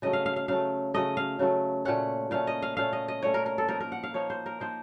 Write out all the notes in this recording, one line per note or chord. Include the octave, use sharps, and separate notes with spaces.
C#3 F#3 A3 D#5
F5
F5
F5
C#3 F#3 A3 F5
C#3 F#3 A3 D#5
F5
C#3 F#3 A3
A#2 A3 C#4 F#5
A#2 A3 C#4 F5
D#5
F5
A#2 A3 C#4 F5
D#5
D#5
A#2 A3 C#4 C#5
A#4
A#4
A4
F3 A#3 D#4 A#4
A#4
F#5
F5
F3 A#3 D#4 C#5
C5
A#4
F3 A#3 D#4 C5